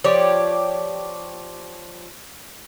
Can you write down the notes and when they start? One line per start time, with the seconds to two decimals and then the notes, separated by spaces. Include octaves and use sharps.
0.04 F3 G4 C#5 D5